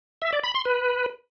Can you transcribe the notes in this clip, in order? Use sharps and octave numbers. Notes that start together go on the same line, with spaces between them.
E5
D5
B5
C6
B4